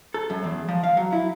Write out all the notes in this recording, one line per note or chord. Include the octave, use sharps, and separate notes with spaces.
A4
F#2
E2
F3
F5
F#3
E4